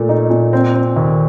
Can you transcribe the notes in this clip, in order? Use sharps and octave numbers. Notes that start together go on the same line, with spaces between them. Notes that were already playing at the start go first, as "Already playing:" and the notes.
Already playing: A#2 A3
D#4
A#2
C4
C4
D#2